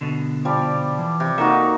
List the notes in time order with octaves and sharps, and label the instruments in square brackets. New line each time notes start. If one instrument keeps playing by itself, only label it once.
[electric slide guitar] B2 D3
[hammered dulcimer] F3 G3 D5
[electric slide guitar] E3
[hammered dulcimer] C3
[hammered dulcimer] A#3 D#4 F#4 [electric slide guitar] A4 E5